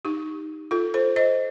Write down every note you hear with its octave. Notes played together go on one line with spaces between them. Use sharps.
D#4 G4
F4 A4
A4 C5
C5 D#5